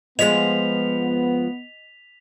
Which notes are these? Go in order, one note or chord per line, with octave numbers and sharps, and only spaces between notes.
F3 G#3 B3 D#5 B6 F7